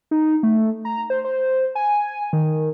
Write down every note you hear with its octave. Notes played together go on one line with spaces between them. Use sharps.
D#4
A3
A#5
C5
C5
G#5
D#3